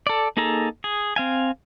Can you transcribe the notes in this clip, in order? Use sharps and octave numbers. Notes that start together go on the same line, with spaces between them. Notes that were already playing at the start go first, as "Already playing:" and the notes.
A4 D5
A#3 D#4 G#4 A4 A#5
G#4
C4 F5 G#5